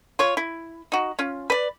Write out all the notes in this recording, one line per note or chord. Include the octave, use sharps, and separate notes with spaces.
F4 C#5
E4
D#4 F#4
C#4 F4
B4 D5